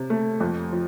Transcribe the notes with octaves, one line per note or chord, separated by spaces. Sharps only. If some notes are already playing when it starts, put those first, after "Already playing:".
Already playing: C3
A3
F2
F3